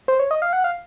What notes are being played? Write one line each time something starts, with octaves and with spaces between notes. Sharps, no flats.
C5
C#5
D#5
F5
F#5
F5